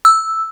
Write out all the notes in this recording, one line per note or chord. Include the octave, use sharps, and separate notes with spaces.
E6